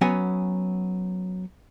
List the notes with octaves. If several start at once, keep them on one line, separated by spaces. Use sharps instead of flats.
F#3 B3 C#4 F#5 G#5